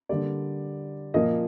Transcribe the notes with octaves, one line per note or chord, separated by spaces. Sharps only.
D3 G3 A#3 D5
A#2 F3 A#3 D#5